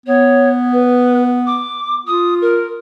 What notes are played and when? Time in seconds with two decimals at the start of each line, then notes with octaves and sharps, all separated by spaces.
0.06 B3 C#5
0.72 B4
1.46 D6
2.06 F4 D#6
2.41 A#4